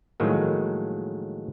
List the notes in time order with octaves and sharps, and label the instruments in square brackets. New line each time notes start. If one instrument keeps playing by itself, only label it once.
[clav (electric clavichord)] A2 D#3 F3 F#3 G#3 A#3